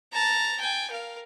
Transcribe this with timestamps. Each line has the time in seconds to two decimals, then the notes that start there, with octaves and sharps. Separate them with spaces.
0.12 A5 A#5
0.60 G5 G#5
0.91 A#4 F5